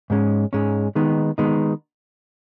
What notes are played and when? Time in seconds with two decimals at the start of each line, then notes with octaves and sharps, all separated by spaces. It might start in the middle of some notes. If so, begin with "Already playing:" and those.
0.10 G#2 G#3 C#4
0.53 G#2 G#3 C#4
0.95 D#3 G#3 B3 D#4
1.38 D#3 G#3 B3 D#4